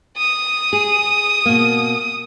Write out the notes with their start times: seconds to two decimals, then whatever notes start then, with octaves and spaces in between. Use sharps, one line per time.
0.18 D#6
0.73 G#4
1.46 B2 A#3